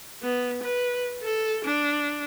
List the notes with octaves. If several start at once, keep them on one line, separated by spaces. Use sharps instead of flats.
B3
B4
A4
D4